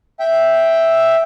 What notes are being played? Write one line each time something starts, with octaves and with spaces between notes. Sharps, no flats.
E5 G5